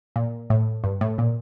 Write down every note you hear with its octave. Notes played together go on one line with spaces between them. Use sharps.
A#2
A2
G2
A2
A#2